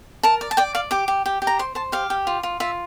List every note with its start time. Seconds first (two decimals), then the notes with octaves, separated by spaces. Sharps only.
0.23 A#4 A5
0.41 D5
0.51 A5
0.57 D5 G5
0.75 D5 F5
0.91 G4 D6
1.08 G4
1.26 G4
1.42 G4
1.47 A#5
1.59 C5 C6
1.75 C5 A5
1.92 G4 F5
2.10 G4
2.27 F4
2.43 F4
2.60 F4 E5